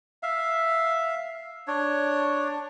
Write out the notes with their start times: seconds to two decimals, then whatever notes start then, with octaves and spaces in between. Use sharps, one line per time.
0.23 E5 F5
1.67 D4 C#5